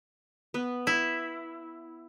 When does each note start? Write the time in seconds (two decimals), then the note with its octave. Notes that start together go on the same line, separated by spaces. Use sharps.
0.54 B3
0.87 E4